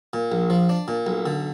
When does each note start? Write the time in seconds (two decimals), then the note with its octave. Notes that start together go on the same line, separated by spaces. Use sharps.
0.13 A#2
0.32 A#1
0.50 F3
0.69 D4
0.88 A#2
1.07 B1
1.26 D3